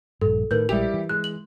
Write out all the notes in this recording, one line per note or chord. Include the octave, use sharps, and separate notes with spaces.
A#1 G2 A4
A2 D#3 A#4 B4 G6
A#1 G3 G#3 E4 G4 F7
E3
G#3 F#6
F#7